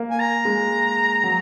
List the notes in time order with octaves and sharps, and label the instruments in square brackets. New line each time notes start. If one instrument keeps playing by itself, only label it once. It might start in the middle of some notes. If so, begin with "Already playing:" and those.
Already playing: [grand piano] A#3
[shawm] G#5
A#5
[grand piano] G#3
F#3